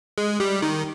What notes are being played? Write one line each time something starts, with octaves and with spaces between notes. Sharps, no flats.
G#3
G3
D#3